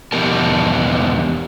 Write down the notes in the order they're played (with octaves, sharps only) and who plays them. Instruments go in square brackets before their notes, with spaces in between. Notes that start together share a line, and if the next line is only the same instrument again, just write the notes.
[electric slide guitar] E2 B2 B3 G4 A#4 A5